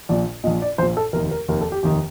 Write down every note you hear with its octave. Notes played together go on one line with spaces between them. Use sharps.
A#1 A#2 D5
A#1 A#2 D#5
D5
A#1 A#2 C5
A4
F1 D#2 D#3 A#4
A#4
F1 D#2 D#3 A#4
A4
G4
F1 D#2 D#3 G4